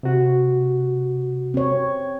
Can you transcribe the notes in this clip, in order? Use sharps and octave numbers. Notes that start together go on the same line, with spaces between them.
C3 F#4
C4 C#5